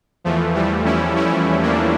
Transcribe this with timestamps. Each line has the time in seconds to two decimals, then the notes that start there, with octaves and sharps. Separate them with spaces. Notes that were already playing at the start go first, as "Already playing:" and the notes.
0.24 E2 E3 F3 A3
0.55 E3 G3
0.85 C#4 E4
1.16 C#4 E4
1.62 A#3 D4